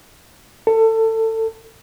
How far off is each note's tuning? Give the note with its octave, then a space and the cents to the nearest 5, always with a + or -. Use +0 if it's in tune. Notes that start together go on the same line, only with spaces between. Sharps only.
A4 +25